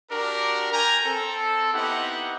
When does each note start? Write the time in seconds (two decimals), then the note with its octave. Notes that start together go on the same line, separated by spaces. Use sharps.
0.10 D4 F#4 G4 A#4
0.72 A#4 G5 G#5 A#5
1.04 C4 A4
1.74 B3 C4 D#4 E4 G4 F#5